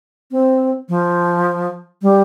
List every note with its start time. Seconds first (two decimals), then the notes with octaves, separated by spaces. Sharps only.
0.31 C4
0.89 F3
2.02 G3